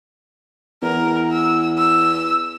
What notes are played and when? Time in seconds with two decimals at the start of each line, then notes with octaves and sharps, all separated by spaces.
0.83 E2 A#4
1.32 E6
1.78 E6